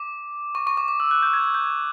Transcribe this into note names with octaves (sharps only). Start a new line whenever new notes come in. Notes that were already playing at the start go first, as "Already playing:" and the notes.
Already playing: D6
C#6
C#6
D6
D6
E6
F#6
G6
G#6
G#6
G6
G#6